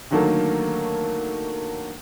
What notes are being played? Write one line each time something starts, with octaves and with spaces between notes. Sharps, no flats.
D3 D#3 F#3 A3 A#3 A4